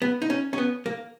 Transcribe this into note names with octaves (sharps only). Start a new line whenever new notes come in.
B3
D#4
C#4
C#4
B3
A#3